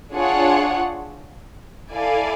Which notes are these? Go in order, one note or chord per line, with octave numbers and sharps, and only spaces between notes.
D4 F4 G#4 C#5 F#5
E4 A4 D5 F5 G#5